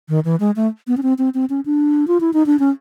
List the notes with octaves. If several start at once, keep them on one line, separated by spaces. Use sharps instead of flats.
D#3
E3
G#3
A3
B3
C#4
C4
C4
C4
C#4
D4
F4
E4
D#4
D4
C#4